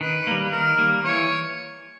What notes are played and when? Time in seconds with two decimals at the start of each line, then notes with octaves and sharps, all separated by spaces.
0.01 D#3 B4
0.27 G3 A#3
0.52 D#3 A#4
0.78 G3 A#3
1.05 E3 C#5